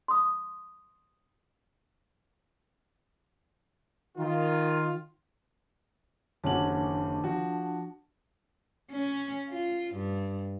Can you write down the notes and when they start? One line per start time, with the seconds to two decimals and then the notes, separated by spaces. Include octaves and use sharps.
0.08 C6 D#6
4.17 D#3 F4
6.44 F#1 D#2 C#4 D4 F#4 A5 F#7
7.24 F3 F#4
8.91 C#4
9.50 F4
9.94 G2